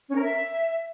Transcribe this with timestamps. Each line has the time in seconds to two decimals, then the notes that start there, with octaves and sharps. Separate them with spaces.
0.08 C#4
0.15 A#4
0.22 E5